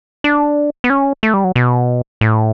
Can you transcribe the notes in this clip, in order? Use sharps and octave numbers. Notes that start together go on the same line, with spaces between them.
D4
B3
C#4
A3
G3
F#3
B2
A2